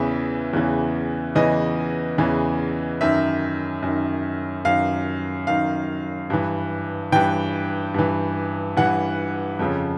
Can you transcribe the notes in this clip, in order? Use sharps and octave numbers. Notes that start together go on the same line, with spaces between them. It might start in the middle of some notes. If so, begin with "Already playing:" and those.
Already playing: E2 C#3 E3 E5
E2 C#3 E3
E2 C#3 E3 D#5
E2 C#3 E3
F#2 D#3 E5
F#2 D#3
F#2 D#3 F5
F#2 D#3 F5
G2 E3
G2 E3 G5
G2 E3
G2 E3 F#5
F2 C#3 F3